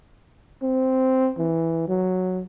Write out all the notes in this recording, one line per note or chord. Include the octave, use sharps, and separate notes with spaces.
C4
E3
F#3